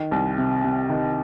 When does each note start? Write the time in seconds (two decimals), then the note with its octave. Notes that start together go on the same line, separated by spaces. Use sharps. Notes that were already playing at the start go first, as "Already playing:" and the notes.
Already playing: D#3
0.11 C2
0.38 C3
0.64 C3
0.90 D#3